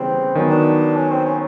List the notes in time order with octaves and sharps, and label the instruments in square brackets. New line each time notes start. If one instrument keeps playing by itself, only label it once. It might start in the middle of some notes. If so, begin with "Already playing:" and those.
Already playing: [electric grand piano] C#3 E3 G3 B3 [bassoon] C4
[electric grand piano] D#3 F#3 B3 [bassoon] C#4
[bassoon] D4
C#4
C4
C#4